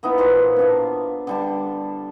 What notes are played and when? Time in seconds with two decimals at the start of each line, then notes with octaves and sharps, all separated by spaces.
0.03 A#3 B3 D#4 E4
0.18 A#2 E3 C5
0.56 B3 D4 F5
1.27 D3 G3 A5